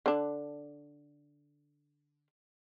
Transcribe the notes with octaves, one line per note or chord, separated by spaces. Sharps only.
D3 D4